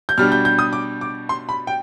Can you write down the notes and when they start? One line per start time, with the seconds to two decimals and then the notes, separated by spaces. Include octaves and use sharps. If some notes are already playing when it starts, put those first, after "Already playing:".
0.09 G6
0.18 B2 G3 D4 F6
0.32 G6
0.45 G6
0.59 D#6
0.73 D6
1.01 D6
1.29 C6
1.49 B5
1.67 G5